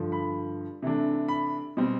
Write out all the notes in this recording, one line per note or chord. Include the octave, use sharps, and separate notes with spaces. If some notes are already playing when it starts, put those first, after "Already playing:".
Already playing: G2 D3 F3
B5
C3 E3 A3 D4
B5
B2 G3 C4